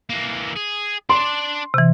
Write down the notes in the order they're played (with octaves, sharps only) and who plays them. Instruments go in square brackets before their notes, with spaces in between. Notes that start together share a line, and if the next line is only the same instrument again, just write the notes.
[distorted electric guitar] E3 A#3
G#4
[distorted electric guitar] D4 D5 [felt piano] C6
[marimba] C3 E3